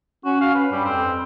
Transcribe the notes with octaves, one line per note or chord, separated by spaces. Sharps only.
C#4 F#4
F5
B4
G2 G3
F2 C4